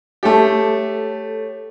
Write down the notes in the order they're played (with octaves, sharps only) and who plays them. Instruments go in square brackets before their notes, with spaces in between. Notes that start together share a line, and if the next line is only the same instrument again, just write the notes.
[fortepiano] A3 G4 [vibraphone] A4 C#5